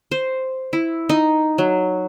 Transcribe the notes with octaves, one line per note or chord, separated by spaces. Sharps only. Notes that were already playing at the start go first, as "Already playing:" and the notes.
C5
E4
D#4
F#3